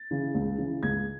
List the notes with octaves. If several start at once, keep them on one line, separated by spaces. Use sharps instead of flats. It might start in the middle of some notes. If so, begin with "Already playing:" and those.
Already playing: A6
C#3 E3
C#2
C#3 E3
C#2 G#6